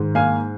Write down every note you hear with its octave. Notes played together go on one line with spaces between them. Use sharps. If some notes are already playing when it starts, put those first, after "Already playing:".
Already playing: G#2 D#3
A#3 F5 G#5